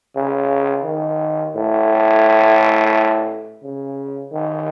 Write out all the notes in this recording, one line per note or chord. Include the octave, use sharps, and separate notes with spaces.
C#3
D#3
A2
C#3
D#3